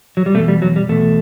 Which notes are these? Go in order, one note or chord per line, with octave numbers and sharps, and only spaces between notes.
F#3
G3
E2 B2 A3
G3
F#3
G3
E2 B2 A3